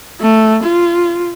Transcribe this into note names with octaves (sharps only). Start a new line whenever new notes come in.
A3
F4